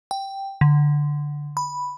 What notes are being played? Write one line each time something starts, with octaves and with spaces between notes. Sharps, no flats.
G5
D3
B5